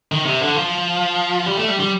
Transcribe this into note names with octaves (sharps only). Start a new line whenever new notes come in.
D#3
C3
D3
F3
G3
A3
G3
G3